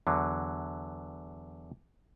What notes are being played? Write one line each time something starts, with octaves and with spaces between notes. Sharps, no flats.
E2 D3 F#3